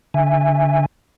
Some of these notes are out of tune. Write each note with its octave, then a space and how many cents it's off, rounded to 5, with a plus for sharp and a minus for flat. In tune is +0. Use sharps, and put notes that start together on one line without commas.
D3 -20 E5 +0 G#5 -20